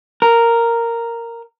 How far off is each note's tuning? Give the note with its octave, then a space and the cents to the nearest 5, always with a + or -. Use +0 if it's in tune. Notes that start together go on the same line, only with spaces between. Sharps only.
A#4 -5